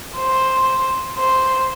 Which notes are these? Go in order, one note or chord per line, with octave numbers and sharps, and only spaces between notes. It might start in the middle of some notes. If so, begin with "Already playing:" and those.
C5
C5